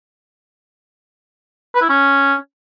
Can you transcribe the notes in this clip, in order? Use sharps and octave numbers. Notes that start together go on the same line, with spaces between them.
B4
E4
C#4